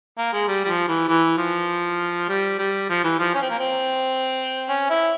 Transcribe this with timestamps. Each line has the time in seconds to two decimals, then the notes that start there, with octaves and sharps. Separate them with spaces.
0.18 A#3
0.33 G#3
0.48 G3
0.64 G3
0.68 F3
0.88 E3
1.09 E3
1.38 F3
2.29 G3
2.59 G3
2.89 F3
3.04 E3
3.19 F3
3.34 C#4
3.42 C4
3.50 A#3
3.59 C4
4.69 C#4
4.90 E4